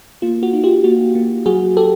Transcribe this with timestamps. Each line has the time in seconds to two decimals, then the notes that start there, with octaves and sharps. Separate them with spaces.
0.22 A#3 F4
0.43 F#4
0.53 D#4
0.64 F4 G4
0.84 A#3 F#4
1.15 A#3
1.46 F#3 F#4 G#4
1.77 G4 A4